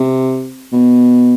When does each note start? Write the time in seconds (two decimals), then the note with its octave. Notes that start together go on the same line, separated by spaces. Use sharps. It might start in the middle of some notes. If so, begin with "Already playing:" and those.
Already playing: C3
0.72 B2